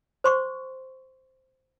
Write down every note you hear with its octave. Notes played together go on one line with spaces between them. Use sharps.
C5 C6 C#6